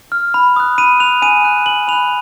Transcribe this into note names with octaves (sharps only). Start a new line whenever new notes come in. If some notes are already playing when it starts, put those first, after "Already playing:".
F6
B5
D#6 F#6
B5 D#7
D#6 F#6 F7
G#5 D#7
B5 F#6
G#5 F#7
B5 F#6 F7